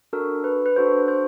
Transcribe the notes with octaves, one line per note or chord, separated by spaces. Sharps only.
D4 F#4 A4 A#4
B4
B4
D4 F#4 A4 C5
C5